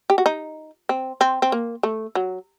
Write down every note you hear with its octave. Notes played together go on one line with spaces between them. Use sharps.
G4
F#4
D#4
C4
C4
C4
A#3
A3
F#3